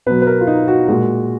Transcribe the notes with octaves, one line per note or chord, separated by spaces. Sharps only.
B2 F#3 B4
B4
A#4
F4
D#4
F#4
A#2 G#3 F#4